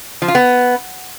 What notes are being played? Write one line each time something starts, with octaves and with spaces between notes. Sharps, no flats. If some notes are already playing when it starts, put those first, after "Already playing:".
F3
F4
B3